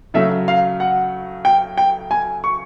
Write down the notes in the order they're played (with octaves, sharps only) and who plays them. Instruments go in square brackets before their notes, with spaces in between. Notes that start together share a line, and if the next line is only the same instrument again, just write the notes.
[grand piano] C#3 F#3 A3 [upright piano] E5
[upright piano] F5
F#5
G5
G5
G#5
C#6